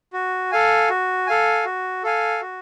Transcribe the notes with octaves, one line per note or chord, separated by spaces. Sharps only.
F#4
A4 F5 G#5
F#4
A4 F5 G#5
F#4
A4 F5 G#5
F#4